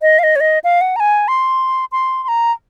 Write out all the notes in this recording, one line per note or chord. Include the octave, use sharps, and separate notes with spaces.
D#5
F5
D#5
C#5
D#5
F5
F#5
A#5
G#5
C6
C6
C6
A#5